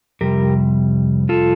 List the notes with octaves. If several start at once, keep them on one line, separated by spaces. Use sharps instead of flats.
F2 C3 G3 G4 A#4
F4 A4